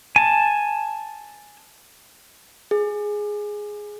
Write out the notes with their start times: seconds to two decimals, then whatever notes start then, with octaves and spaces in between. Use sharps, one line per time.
0.16 G#5 A5
2.71 G#4